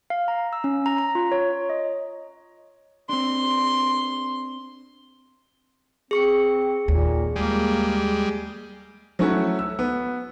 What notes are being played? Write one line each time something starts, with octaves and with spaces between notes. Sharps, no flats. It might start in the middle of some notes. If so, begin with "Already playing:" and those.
F5
A#5
E6
C#4
A#5
A#5
F4
C#5
D#5
C4 D4 C6
C4 G#4 C#6 C#7
D#2 A#2
G3 G#3 A#3
F#3 A3 C#4 E4 F#4
E6
B3